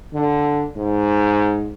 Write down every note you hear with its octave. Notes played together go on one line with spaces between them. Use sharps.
D3
G#2